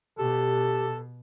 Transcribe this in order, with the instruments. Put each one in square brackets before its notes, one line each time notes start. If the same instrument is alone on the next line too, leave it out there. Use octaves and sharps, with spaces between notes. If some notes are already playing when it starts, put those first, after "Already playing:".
[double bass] B2 [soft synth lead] G4 [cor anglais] A4